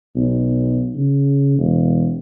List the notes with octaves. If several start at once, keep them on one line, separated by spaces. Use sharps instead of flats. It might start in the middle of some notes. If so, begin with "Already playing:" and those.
B1
C#3
E1